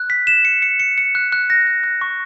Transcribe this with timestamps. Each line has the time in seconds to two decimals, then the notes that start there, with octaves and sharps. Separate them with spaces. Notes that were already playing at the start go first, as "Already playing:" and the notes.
Already playing: F#6
0.10 B6
0.27 E7
0.45 C#7
0.62 C#7
0.79 C#7
0.98 C#7
1.15 F#6
1.32 F#6
1.50 A#6
1.67 F#6
1.84 F#6
2.01 C#6